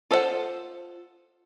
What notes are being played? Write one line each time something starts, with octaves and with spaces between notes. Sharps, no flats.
F4 A4 C5 D#5 F#5